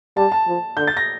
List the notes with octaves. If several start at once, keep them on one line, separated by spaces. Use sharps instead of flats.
G3 A5
A5
F3
D3 G6
A6
A#6